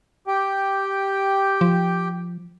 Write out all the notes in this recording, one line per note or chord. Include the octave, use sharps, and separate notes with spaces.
G4 G5
F3